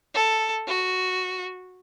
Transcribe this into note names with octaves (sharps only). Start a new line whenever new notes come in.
A4
F#4